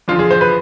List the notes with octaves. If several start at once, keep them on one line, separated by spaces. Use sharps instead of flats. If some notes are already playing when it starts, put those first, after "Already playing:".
E2 D3 F3 F4
G#4
C5
B4